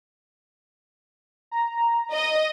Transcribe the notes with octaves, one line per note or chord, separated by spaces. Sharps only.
A#5
D#5